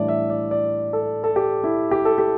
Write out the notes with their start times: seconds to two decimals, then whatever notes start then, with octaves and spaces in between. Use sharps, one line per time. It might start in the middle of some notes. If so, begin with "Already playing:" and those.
Already playing: A2 E3 G3 D4 D5
0.08 E5
0.30 D5
0.51 D5
0.93 A4
1.24 A4
1.36 G4
1.64 E4
1.91 G4
2.05 A4
2.18 G4